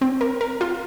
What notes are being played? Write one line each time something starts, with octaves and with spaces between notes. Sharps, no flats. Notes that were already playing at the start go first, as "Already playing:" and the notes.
C4
A#4
A#4
F4